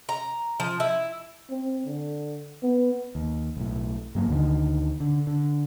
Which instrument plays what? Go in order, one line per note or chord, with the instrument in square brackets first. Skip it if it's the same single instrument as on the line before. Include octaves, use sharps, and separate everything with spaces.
[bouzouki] A#5
F3
E4
[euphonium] C4
D3
B3
[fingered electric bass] D#2
B1 A2
G2 F#3 A#3
D2 D3 D#3
D3
D3